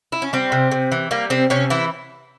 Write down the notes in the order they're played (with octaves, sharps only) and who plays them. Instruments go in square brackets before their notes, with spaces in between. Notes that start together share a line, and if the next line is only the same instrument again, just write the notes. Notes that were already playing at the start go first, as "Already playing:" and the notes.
[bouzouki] E4
C#4
G3 C4
C3
C3
E3
G3 A#3
C3 C4
C3 C#4
E3 E4